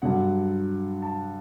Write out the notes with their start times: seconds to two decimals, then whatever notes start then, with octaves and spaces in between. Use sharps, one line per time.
0.02 G2 D3 F#3 F#5
1.02 A5